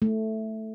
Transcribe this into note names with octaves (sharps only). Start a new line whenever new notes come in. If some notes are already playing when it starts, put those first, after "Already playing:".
A3